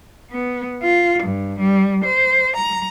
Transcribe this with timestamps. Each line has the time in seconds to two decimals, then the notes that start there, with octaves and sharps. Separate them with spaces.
0.29 B3
0.82 F4
1.21 G2
1.58 G3
2.03 C5
2.55 A#5